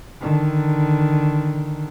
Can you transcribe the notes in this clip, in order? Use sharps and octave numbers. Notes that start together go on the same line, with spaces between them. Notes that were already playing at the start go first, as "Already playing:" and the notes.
D3 D#3